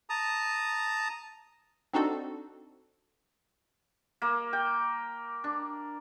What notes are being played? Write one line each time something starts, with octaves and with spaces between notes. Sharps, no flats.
A5 A#5 D#6
C4 D4 D#4 F#4 A4
A#3
G5
D4